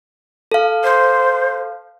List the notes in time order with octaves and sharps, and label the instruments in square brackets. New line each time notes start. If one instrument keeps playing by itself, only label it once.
[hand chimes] A4 F5
[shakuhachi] C5